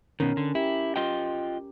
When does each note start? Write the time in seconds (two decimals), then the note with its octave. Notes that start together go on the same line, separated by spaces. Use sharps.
0.20 B2 D#3 C#4 A#4
0.37 D3
0.55 E4 G4
0.96 F4 D#5 G5